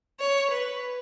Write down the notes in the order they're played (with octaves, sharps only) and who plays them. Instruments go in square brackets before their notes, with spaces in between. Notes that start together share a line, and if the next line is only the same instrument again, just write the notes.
[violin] C#5
B4